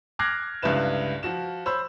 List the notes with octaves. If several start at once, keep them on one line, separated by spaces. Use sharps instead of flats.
D6 F6 F#6 G#6 A#6 C7
C#2 G2 D3 E4 B4 E7
F3 F#4 E7
C5 C#5 B5 E6